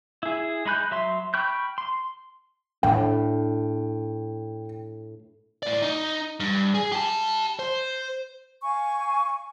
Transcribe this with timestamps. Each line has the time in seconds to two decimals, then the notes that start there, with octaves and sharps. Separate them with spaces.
0.23 E4 G#4
0.66 G#3 D#4 B5 F#6 G6
0.91 F#3 E5 C6
1.34 G5 B5 C#6 F6 G6
1.78 C6
2.83 A2 D4 G5
5.63 A2 D5
5.82 D#4
6.40 G2
6.74 G#4
6.92 G4 A5
7.59 C5
8.63 F5 G#5 C#6